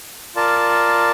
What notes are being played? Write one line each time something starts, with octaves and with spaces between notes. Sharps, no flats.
F4 A#4 D5 A5